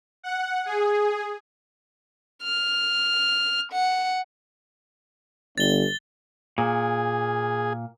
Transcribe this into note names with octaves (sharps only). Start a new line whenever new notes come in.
F#5
G#4
F6
F#5
G1 A6 G7
A#2 G#4